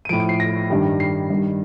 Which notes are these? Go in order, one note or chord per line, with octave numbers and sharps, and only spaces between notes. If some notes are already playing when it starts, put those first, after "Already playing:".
D#7
A2 F3 D7
D7
C7
A#6
G2 D#3 G3
C7
G2 D#3 G3